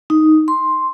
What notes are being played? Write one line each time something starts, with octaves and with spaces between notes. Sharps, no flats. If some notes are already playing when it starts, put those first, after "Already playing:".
D#4
C6